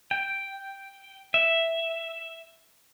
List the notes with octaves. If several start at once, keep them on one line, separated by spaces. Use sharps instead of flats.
G5
E5